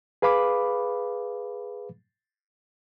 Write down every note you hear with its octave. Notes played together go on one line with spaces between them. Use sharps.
G#4 B4 F5 B5 D6